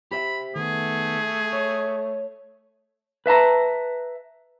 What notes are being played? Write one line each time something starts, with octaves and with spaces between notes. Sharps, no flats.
G4 C5 E5 B5
D#3 A3 B3 G#4
C#5
B4 E5 A5 A#5